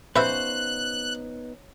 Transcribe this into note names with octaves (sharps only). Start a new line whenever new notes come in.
C#3 B3 D#4 F#4 B4 C5 E5 F#6